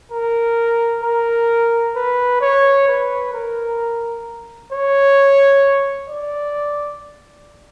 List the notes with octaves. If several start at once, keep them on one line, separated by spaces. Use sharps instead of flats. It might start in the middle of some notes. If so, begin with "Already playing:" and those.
A#4
A#4
B4
C#5
B4
A#4
C#5
D5